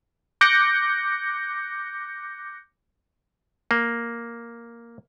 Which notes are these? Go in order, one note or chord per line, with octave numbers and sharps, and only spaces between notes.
D6 F#6 G6 A#6 C#7
A#3